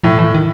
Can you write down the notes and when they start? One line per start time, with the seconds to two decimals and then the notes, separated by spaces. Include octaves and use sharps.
0.03 A2 F3
0.18 A2 E3
0.34 D#3